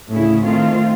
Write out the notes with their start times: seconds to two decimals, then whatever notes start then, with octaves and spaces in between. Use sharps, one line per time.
0.12 D2 A2 C#3 E4 G#4
0.43 D#3 A3 C4 F4 C5 F5